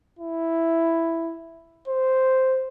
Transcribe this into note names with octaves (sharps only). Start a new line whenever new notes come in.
E4
C5